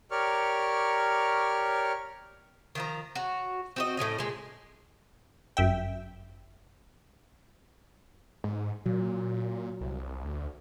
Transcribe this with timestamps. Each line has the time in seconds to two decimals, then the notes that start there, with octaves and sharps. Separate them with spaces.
0.11 G4 A#4 C#5 D5 C#6 F6
2.75 D#3 F3 A#5
3.16 F#4 C#5
3.76 C4 F#4 D#5
3.97 A2 E3 C#4 D#5
4.19 A#2 G#3
5.57 G1 F#2 E5 G5
8.44 G#2
8.86 A#2 F#3
9.81 C2
10.25 D2